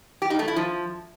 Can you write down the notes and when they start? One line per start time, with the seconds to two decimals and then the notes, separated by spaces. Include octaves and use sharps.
0.22 G4
0.30 D#4
0.39 A3
0.48 E4
0.56 F3